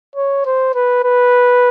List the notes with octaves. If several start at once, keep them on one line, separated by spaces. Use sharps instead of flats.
C#5
C5
B4
B4